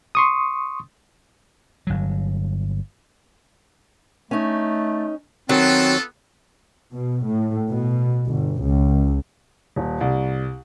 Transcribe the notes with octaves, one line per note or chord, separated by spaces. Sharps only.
C6 C#6 D#6
G1 F#3
A3 C#4 D#4
D#3 F#3 B3 C4 F4 A4
B2
A2
B2
G1
C#2
D#1
C2